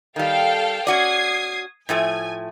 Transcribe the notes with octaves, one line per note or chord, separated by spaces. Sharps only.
D#3 G3 A4 F5 G5
C#4 F#4 D5 D#6 G#6 C7
A2 F3 A3 G#5